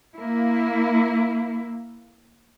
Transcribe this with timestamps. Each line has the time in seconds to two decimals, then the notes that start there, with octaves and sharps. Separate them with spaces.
0.15 A#3 E4